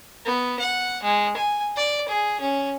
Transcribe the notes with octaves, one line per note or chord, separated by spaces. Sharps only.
B3
F#5
G#3
G#5
D5
G#4
C#4